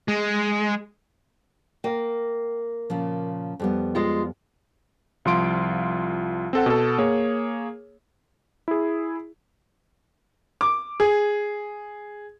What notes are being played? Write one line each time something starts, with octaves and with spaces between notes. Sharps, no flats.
G#3
A#3 G5
A#2 C#3 F3
F2 G3 B3
G#3 F4
C2 F3 F4 C6 D7
C4 A4 F#5
B2 A4
A#3 G#4 C#5
E4 G#4
D6
G#4